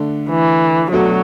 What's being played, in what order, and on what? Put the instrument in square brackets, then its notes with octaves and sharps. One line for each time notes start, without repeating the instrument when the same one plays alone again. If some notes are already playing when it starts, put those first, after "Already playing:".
Already playing: [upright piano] D3 A3 D4
[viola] E3
[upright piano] B2 A3 D4 F#4 A4 [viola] F#3